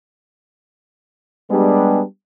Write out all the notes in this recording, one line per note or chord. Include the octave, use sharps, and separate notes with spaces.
G3 G#3 B3 D4 G4 G#4